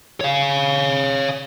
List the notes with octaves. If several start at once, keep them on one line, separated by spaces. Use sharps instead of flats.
C#5 F5